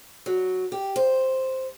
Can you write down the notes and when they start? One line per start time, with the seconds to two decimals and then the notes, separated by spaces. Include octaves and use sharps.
0.26 F#3
0.72 G4
0.96 C5